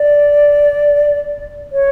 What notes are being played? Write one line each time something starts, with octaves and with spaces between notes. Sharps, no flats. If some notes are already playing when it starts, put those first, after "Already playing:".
Already playing: D5
C#5